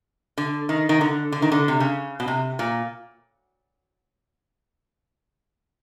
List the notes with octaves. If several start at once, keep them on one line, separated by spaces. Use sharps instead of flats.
D3
D#3
D#3
D3
D3
D#3
D3
C3
C#3
B2
C3
A#2